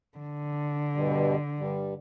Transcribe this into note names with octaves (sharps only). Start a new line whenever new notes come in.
D3
G2 B2 G3
G2 G3